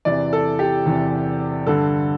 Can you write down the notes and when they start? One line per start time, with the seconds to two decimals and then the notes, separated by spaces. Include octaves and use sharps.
0.05 E2 C3 E3 D5
0.33 A4
0.59 G4
0.86 E2 C3 E3
1.66 G2 D3 A4